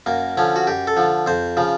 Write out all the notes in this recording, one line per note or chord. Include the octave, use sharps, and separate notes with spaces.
F#2 A#3
D3 F3 C#4
F#4
F#2 G4
A4
D3 F3
F2 C5
C#3 F3